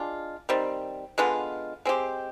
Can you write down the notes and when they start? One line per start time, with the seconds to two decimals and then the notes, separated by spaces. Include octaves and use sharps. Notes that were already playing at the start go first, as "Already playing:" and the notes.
Already playing: G#3 D4 F4
0.49 D#3 G3 C4
1.18 D3 G#3 B3 F4
1.85 G#3 C4 G4